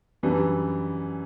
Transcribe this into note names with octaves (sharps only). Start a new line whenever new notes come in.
F#2 E3 G3 D4